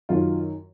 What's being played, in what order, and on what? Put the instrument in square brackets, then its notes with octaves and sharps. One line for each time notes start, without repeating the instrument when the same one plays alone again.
[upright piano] F#2 D#3 F#3 F4